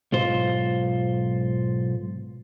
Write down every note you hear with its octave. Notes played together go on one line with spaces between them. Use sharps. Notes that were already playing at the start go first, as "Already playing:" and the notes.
B1 G#2 F4 C5